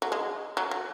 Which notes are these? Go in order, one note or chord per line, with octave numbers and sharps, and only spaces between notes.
F#3
G#3
F#3
F#3